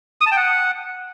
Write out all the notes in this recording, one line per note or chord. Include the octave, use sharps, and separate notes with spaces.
D#6
A5
G5
F#5